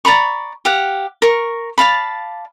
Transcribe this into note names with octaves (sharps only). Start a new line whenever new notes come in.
D5 A#5 B5 C#6
G4 F5 F#5
A#4 C#6
D5 F5 A5 B5